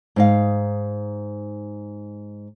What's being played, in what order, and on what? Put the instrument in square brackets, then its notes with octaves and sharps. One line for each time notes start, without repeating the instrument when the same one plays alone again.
[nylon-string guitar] G#2 D#4 F5